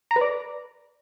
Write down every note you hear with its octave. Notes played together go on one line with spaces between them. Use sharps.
A#5
B4
D5